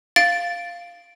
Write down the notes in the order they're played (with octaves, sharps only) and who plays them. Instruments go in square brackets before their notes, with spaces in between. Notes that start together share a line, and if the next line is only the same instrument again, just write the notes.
[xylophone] F5 A6 D7